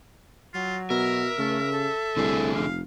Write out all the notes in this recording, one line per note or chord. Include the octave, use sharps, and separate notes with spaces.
F#3 F4
B2 A#4 E5
C#3 A3
A4
C2 D3 A3 G#4
F1 F5